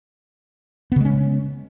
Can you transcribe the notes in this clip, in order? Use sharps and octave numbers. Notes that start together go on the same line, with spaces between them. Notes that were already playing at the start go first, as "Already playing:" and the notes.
C#3 G#3 B3 C#4